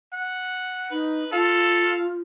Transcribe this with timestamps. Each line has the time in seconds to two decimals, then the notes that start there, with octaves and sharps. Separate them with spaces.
0.13 F#5
0.91 D#4 B4
1.32 F4 A4 F5